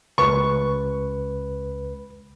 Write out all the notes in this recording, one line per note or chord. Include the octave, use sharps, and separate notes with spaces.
C#2 B4 C#6